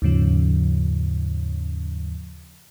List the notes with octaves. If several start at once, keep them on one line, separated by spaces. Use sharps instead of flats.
D#2 G#2 C#3 F3